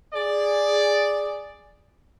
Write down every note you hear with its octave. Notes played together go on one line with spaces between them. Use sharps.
G#4 D5